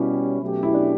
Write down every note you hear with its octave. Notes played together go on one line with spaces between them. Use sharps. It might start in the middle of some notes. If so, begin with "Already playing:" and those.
Already playing: B2 G3 C#4 E4 G4
B2 F#3 A3 C#4 G4
E4
D4